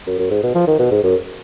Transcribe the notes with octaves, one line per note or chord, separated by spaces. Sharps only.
F#2
F#2
G#2
B2
F3
D#3
B2
G#2
F#2